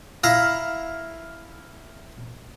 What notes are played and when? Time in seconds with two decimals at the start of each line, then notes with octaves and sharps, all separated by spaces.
0.24 E4 E5 F5 A#5